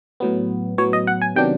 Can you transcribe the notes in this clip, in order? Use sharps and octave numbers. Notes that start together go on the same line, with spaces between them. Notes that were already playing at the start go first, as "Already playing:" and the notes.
A2 F#3 B3
A2 F#3 B3 C#5
D#5
F#5
G#5
C3 D#3 F#3 B3 D4 G5